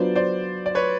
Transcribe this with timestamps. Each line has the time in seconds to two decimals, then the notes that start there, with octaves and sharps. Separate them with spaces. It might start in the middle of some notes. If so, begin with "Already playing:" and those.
Already playing: F#3 B3 D4 F4 C5 D5
0.15 C5 D5
0.66 D5
0.75 B4 C#5